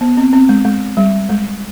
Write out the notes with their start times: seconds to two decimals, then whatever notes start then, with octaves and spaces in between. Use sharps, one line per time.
0.01 B3
0.17 C4
0.33 C4
0.49 G#3
0.65 G#3
0.97 G3
1.29 G#3